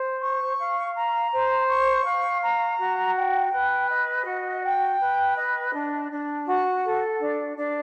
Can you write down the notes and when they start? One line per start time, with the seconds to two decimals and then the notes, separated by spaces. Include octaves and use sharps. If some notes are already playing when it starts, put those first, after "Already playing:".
Already playing: C5
0.21 C#6
0.58 F5
0.95 A#5
1.32 C5
1.68 C#6
2.04 F5
2.41 A#5
2.79 F#4
3.15 G5
3.51 B4
3.89 D#5
4.25 F#4
4.63 G5
5.00 B4
5.35 D#5
5.73 D4
6.10 D4
6.47 F#4
6.83 A4
7.20 D4
7.56 D4